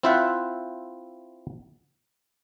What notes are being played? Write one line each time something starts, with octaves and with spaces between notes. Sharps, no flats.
C4 E4 F4 C5 E5 F#5